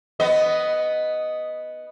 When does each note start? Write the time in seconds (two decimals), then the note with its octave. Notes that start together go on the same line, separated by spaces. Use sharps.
0.20 B3 D#5